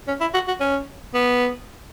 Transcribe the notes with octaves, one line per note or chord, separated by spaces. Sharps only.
C#4
E4
F#4
F#4
C#4
B3